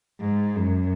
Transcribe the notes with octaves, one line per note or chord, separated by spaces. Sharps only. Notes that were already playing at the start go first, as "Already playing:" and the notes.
G#2
F#2